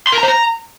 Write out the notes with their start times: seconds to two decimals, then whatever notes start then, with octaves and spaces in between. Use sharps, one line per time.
0.07 C6
0.12 A#4
0.18 A#5
0.23 C5
0.28 A#5